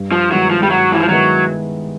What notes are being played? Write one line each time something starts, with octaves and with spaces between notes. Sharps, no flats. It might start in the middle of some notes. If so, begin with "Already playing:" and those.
Already playing: G2
F3
D#3 F#3 G#3 B3 E4
F3
G3
G2 F#3
E3
F3
D#3 F#3 G#3 B3 E4